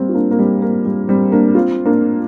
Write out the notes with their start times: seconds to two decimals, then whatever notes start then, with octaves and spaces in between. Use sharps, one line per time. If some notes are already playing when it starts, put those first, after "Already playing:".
Already playing: G3 A#3 C4
0.09 F4
0.15 A#3 D4
0.31 A#3
0.39 G3 C4
0.62 A#3
0.85 G3
1.08 G3 C4
1.32 A#3 D4
1.55 C4 F4
1.86 A#3 D4